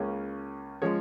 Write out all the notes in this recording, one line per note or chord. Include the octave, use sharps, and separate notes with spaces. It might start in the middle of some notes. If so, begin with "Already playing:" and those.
Already playing: C#2 C#3 A#3 C#4
F3 G#3 C#4 C#5